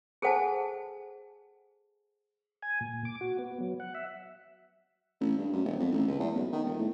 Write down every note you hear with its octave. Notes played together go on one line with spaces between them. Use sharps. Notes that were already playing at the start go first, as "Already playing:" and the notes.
G#4 A4 C5 F#5 G#5 A5
G#5
A#2
D6
F#4
B3
F#3
F#5
E5
A1
G2
F#2
E1
F2
A1
C#2
E2
B1
D#3
E1
A2